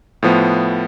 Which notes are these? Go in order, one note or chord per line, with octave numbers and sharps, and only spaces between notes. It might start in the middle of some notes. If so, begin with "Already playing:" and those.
A2 F3 B3